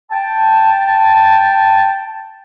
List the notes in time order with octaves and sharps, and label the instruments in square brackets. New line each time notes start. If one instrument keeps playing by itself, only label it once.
[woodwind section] G5 A5